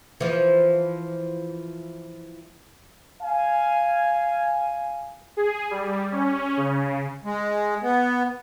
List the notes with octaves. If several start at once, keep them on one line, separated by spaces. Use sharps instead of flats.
E3 F3
F5 G#5
G#4
G3
C#4
C#3
G#3
B3